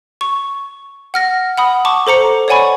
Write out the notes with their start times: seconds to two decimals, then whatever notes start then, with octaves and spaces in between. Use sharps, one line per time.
0.21 C#6
1.14 F#5 F6 A#6
1.58 F#5 B5 D#6
1.85 A5 C#6 D6
2.07 A4 C5 A#5 C#7
2.48 C#5 D5 F#5 G#5 B5 C#6